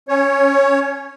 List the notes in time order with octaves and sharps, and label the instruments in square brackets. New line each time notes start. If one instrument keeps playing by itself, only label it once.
[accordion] C#4 C#5